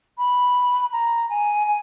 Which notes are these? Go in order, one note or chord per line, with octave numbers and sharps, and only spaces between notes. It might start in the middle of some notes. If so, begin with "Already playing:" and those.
B5
A#5
G#5
G#5